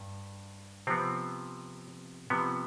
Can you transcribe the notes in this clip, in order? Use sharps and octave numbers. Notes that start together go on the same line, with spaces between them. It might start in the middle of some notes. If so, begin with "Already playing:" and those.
Already playing: G2
C3 F3 B3 C4
C3 F3 B3